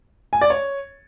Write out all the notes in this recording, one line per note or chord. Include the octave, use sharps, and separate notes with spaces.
G#5
D5
C#5